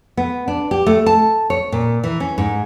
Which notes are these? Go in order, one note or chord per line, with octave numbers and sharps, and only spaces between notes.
B3
D4
G4
A3
A5
C#5
A#2
E3
C#4
G#2